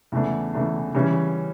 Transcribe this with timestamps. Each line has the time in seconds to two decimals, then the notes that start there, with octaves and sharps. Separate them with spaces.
0.12 E2 C#3 E3 A3 D4
0.53 E2 C#3 E3 A3 D4
0.95 C#3 E3 G3 C#4